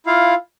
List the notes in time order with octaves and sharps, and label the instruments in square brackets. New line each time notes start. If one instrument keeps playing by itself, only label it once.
[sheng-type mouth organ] E4 F4 F5